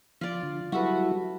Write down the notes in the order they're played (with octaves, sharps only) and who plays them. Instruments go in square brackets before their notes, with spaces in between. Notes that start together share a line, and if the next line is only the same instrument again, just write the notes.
[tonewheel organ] F3 [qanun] F4 D5
[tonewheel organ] D3
[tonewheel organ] F#3 G3 E4 [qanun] F#4 A4 B4